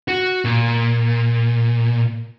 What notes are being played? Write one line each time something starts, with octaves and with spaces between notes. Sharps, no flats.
F#4
A#2